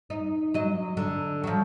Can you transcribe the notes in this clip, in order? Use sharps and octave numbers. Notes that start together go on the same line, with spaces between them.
D#4
F#3 D#5
D3
F3 F#3